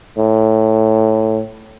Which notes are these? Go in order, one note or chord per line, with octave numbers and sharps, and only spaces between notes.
A2